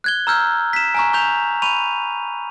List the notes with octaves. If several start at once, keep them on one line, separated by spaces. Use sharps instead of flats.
F#6 G#6 G7
A#5 E6 F6 G6 G#6
B6 E7
G#5 A#5 C#6
C#6 G6 F7
B5 C#6 D#7 F7